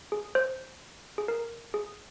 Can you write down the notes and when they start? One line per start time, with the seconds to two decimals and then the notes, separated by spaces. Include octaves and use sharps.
0.12 G#4
0.35 C5
1.18 G#4
1.28 A#4
1.74 G#4